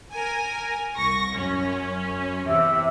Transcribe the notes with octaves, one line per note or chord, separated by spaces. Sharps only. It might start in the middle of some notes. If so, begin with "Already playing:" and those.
A#4 G#5
C2 C#6 A#6
F#2 C#4
E2 C3 E5